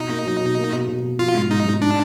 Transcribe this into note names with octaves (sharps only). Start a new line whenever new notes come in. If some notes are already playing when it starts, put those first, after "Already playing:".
Already playing: B2 D#4
A#3
F#3
B2
A#3
B2
B2
B2
F3 F4
G#2
G#2 D#4
G#2
D4 D#4